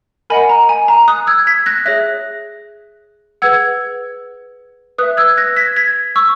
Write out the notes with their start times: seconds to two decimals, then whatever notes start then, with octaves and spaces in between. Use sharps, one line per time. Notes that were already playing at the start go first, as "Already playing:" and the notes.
0.30 A#4 D#5 F#5 G#5 B5
0.49 A#5
0.69 G#5
0.88 A#5
1.08 D#6 F#6
1.27 E6 G#6
1.47 G#6 B6
1.66 F#6 A#6
1.85 G#4 C#5 E5 F#6 A#6
3.42 G#4 B4 F#5 E6 G#6
4.98 B4 E5 D#6 F#6
5.17 E6 G#6
5.37 F#6 A#6
5.56 G#6 B6
5.76 G#6 B6
6.16 C#6 E6